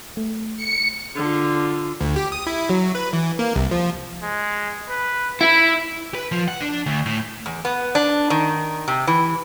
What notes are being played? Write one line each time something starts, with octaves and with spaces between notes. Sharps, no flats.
A3
C#7
D3 F4
D2
G4
D#6
E4
F#3
B4
E3
A#3
C2
F3
G#3
B4
E4 B5
B4
F3
F#5
D4
D2
A2
E2
B3
D4
D#3
C3
E3